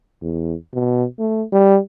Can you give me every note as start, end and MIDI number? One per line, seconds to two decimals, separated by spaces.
0.22 0.55 40
0.74 1.04 47
1.19 1.43 57
1.52 1.79 55